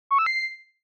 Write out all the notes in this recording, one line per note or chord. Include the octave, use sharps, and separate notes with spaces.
C#6
E6
C7